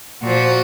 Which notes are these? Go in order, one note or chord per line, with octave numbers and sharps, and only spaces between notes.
A#2 F3 F#4